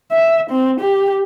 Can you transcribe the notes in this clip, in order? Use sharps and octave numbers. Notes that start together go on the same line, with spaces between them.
E5
C4
G4